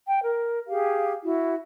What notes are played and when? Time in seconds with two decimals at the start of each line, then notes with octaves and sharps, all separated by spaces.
0.07 G5
0.22 A#4
0.68 G4 G#4 F5
1.24 E4 F#4